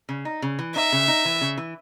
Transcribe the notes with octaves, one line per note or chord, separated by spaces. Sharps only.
C#3
D#4
C#3
E3
D#4 E5
C#3
D#4
E3
C#3
E3